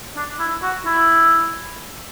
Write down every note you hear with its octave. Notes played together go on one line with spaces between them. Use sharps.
D4
E4
F#4
E4